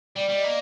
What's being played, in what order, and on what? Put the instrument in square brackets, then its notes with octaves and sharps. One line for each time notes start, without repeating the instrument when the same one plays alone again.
[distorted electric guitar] G3 [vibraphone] D5
[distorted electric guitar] G3 [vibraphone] D#5
[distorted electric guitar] A#3